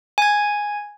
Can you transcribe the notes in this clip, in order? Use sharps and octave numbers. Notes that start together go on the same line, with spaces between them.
G#5 G#6